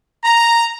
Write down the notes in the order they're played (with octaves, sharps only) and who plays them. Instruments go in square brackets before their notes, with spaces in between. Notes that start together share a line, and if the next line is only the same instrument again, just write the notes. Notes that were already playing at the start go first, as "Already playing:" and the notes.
[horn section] A#5